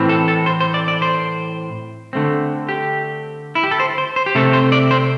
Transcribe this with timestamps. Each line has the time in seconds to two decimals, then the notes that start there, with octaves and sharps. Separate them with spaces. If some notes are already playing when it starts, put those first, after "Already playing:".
Already playing: A2 E3 C4
0.09 A4
0.28 A4
0.46 C5
0.60 C5
0.74 D5
0.88 D5
1.02 C5
2.13 D3 A3 C4
2.69 G4
3.55 E4
3.64 G4
3.71 A4
3.80 C5
3.98 C5
4.16 C5
4.26 G4
4.35 C3 A3 C4 A4
4.53 C5
4.72 D5
4.91 C5